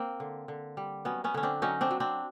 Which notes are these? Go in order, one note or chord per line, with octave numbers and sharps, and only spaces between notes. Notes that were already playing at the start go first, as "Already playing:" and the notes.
Already playing: A#3 C4
D3
D3
G3
F#3 B3 C#4
B3 C#4
D3 C#4
C4 D4
F#3 C#4 D#4
C4 D4
F#3
C4 D4